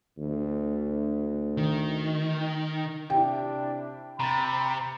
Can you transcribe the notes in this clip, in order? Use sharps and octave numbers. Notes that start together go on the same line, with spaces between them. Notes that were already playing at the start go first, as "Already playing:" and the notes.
D2
D#3
C3 D4 E4 G5
C3 A#5 B5 A6